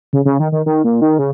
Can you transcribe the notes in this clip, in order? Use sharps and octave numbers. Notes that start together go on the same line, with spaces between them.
C#3
C#3
D#3
D#3
D#3
A#2
D#3
C#3